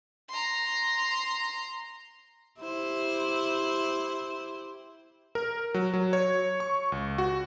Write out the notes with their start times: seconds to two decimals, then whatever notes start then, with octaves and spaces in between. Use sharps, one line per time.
0.30 A#5 C6
2.60 E4 G4 C5
5.35 A#4
5.74 F#3
5.93 F#3
6.13 C#5
6.60 C#6
6.92 C#2
7.18 F#4